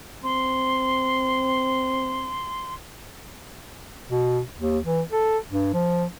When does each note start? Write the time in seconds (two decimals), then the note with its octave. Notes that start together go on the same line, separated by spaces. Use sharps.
0.24 C4 C6
4.09 B2
4.59 D#2
4.85 E3
5.12 A4
5.49 G2
5.73 F3